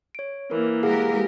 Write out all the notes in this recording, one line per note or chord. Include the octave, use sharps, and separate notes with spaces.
C#5 D7
E3 A#3 A#4
G#3 G4 G#4 A#4 F5 F#5